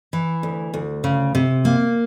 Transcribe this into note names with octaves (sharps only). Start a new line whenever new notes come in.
E3
D2
D2
C#3
C3
A#3